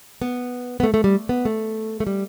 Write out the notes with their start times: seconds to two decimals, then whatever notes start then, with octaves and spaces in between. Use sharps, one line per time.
0.22 B3
0.80 B3
0.83 A3
0.94 A3
1.04 G3
1.29 B3
1.45 A3
2.00 A3
2.07 G3